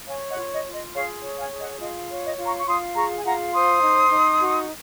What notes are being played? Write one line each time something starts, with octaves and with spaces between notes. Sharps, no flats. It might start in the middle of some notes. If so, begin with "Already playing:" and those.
C#5 F5 G#5
D#5 F#5
F4
D#5
F4
D#5
G#4 C#5 F5
C#5
F5 G#5
G#4
D#5 F#5
F4 D#5
C#5
D#5
F4
A#5 C#6
C#6
F4 C6 D#6
G#4 A#5 C#6
G#5
F4 F#5 A#5
C5 C6 D#6
D#4
D#4
F#4